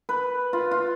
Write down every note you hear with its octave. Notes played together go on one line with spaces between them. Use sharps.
B4
F4
F4